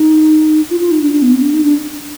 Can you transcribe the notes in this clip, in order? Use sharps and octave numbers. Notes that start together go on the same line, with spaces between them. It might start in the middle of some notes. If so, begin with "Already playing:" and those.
Already playing: D#4
F4
F4
D#4
D4
D4
B3
C4
D4
D#4
D4